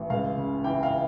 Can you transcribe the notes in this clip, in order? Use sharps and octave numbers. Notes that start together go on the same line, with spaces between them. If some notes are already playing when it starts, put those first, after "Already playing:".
Already playing: A1
C#2 F5
C#3
E3 G5
F5